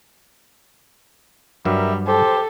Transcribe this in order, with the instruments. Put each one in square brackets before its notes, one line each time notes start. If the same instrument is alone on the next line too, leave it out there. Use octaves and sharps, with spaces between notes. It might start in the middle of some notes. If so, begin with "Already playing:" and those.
[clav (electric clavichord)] G2 F#3 [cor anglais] G3 [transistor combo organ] A#4 E5
[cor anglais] G4 [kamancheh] A4 [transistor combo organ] C5